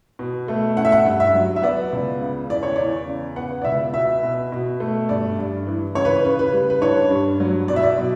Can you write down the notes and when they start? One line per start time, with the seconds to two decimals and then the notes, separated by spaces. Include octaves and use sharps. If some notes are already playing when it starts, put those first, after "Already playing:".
0.19 B2
0.48 A3
0.77 C#4 F#5
0.85 E5
0.92 F#5
1.06 G2
1.20 E5
1.34 F#3
1.56 E5
1.63 B3 D5
1.92 C#2
2.21 C#3
2.49 E2 D5
2.63 C#5
2.76 E2 D5
3.08 C#3
3.36 B3 F#5
3.62 D5
3.65 C#2 E5
3.93 B2 E5
4.23 B2
4.52 B2
4.80 A3
5.09 G2 D5
5.38 G2
5.67 E3
5.95 C#3 C#5
6.05 B4
6.25 C#3 B4
6.39 B4
6.53 G3
6.70 B4
6.82 D4 C#5
7.11 G2
7.40 F#3
7.68 B2 D5
7.76 E5
7.83 D5
7.98 B2